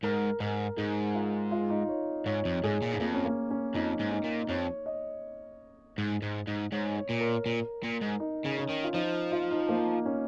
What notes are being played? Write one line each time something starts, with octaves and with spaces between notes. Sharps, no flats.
G#2 A#4
G#2 A#4
G#2 G#4
F4
F4
D#4
C#5
G#2 C#5
F2
G#2 G#4
A#2
G#2
F2 A#3
C#4
A#3
C#4
F2 D#4
G#2
D#4
A#2
F2 C#5
D#5
G#2
G#2
G#2
G#2 C#5
C#5
A#2
A#4
A#2
A#2
G#2
D#4
C#3
C#4
D#3
F4
F3 D#4
F4
D#4
A#3
C#4